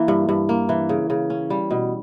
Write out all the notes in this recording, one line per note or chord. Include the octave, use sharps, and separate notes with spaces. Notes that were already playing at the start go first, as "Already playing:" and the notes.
Already playing: E3 A#3
G2
G2
A#3
E3
C#3
C#3
C#4
G3
B2